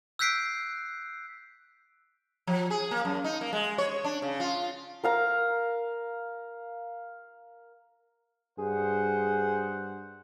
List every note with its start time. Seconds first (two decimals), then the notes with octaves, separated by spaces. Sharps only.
0.19 E6 F#6 G6 B6 C7 D7
2.47 F3
2.70 G#4
2.91 A#3
3.05 F#2
3.24 D#4
3.41 A#3
3.53 G#3
3.78 C#5
4.04 D4
4.22 C#3
4.40 F4
5.04 A#4 F5 A#5
8.58 G2 G#4 C5 F#5